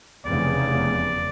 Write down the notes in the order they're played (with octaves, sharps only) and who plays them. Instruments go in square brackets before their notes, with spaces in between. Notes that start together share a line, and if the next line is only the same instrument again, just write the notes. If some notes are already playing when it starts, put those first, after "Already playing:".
[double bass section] F1 E2 C#3 [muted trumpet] D5